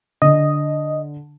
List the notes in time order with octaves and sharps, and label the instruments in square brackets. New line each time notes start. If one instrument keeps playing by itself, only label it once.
[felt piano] D3 [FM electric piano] D#5